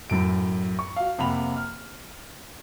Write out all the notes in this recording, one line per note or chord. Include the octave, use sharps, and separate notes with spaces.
F#2 A2 D7
C#6
F#4 F5
F2 C3 A#3 F#5 B5 F7
F6